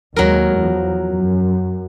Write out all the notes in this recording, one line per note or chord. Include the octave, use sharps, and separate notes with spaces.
D#2 F#3 G#3 A#4
E2 F3
F#2